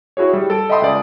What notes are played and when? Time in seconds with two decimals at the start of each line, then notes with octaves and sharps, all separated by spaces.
0.17 E4 F#4 G#4 C#5
0.33 G3
0.50 A4 D7
0.70 D#5 E5 G5 B5 C6 D#6
0.82 C#2 D5